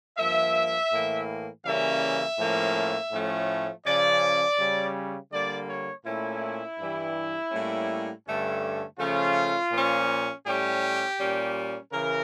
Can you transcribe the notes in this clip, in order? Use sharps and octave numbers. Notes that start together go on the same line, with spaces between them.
G2 F3 A#3 E5
A2 E3 A#3
C#3 E3 G3 A#3 C#4 E5
A2 F3 A#3 C#4
A2 F3 A3 C#4
C#3 F3 C#4 D5
C#3 G3 C#4
D3 G3 A#3 D5
C#5
A#2 A3 C#4 E4
G2 E3 G3
A2 G3 A#3 C#4
G2 D3 A3 C#4
C#3 F3 A3 C#4 F4
A#2 F3 C#4
A2 G3 C#4 G4
A#2 G3 C#4
C#3 E3 A#4